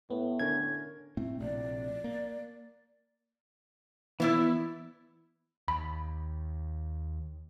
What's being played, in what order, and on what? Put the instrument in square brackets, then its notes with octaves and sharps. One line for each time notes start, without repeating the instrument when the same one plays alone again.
[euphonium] A2 [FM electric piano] B3
[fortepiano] D3 C#4 A#4 [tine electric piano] G#6
[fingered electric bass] A2 A3 C4
[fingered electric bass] A#1 A2 C3 [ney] D5
[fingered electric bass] A#3
[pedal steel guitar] E3 E6 [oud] B3 E4 D5
[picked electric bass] D#2 [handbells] B5